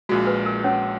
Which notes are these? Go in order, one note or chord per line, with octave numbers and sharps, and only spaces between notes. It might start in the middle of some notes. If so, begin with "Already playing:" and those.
A#1 A#2 G#3 F#4
B4
A#4
C#4 C#5